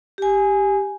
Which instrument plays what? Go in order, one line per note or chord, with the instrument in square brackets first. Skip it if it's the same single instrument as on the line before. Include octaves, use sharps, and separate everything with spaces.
[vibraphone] G4 G#5